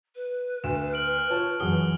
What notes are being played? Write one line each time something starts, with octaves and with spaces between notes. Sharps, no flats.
B4
D2 E7
F6 D7 F#7
F4 C#5 A5
F#2 E3 F#4 G#4 D#6 G7